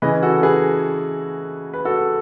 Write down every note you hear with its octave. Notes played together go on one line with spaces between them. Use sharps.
C#3 E3 B4 D#5
F#4 A4
G#4 B4
B4
F#4 A4